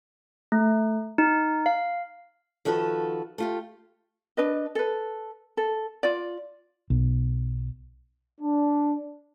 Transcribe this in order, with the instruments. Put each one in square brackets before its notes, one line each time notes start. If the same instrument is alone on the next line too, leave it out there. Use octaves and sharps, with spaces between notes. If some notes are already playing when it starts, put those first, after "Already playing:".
[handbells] A3
D#4
F5
[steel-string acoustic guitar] D#3 F3 F#4 A4 B4
A3 F4 G4
[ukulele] D4 B4 D#5
A4 B4
A4
F4 D5
[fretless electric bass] B1
[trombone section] D4